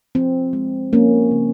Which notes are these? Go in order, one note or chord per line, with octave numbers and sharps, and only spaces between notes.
F3 C4
G#3
F3 A#3 C#4
C#3